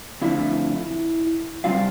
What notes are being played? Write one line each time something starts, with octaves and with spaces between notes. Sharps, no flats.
F2 D3 F3 A3 E4 E5
C3 G3 C4 F4 F5